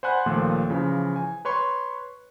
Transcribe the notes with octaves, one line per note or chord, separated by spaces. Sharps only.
C5 D5 F#5 G#5 B5 F#6
D#2 A#2 F3 A3
C#3 E3 F3
G#5
B4 C#5 C6 C#6